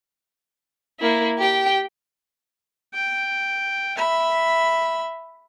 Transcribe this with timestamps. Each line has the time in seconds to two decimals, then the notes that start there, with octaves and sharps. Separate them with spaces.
1.00 A#3 E4
1.38 G4 G5
2.94 G5
3.97 E5 B5